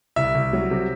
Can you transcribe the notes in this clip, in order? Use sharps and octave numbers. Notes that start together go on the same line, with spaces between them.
C2 E5
C2
F#3
C3